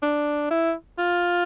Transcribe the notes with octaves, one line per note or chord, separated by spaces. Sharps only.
D4
E4
F4